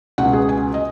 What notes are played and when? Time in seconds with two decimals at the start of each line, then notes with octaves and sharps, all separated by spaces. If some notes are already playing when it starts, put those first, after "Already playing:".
0.18 C#2 B2 B3 F#5
0.33 G#4
0.49 G#5
0.74 D#5